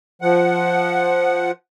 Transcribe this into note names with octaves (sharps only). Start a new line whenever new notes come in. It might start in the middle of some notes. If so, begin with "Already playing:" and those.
F3 F#5